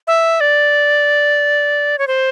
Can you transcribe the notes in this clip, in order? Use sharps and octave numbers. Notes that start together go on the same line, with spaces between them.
E5
D5
C#5
C5